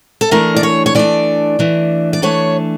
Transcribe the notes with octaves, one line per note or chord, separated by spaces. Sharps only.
A4
E3 A3 D4 A#4
D5
C#5
C#5
E3 A3 D4 D5
E3 A3 D4
D5
E3 A3 D4 C#5